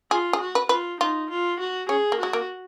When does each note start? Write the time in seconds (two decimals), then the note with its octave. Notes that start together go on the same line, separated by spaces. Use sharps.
0.11 F4 G#4
0.33 G#4
0.41 F#4
0.55 B4
0.69 F4 B4
1.00 D#4 F4
1.30 F4
1.60 F#4
1.89 C#4 G#4
2.12 A#3
2.19 G#3 F#4
2.33 A#3